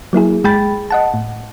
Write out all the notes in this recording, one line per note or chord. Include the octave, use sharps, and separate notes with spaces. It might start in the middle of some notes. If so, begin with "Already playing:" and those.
F#3 A#3 E4 G#4
G1 G#3 G#4 G5 B5 A6
D#5 F#5 A5
A2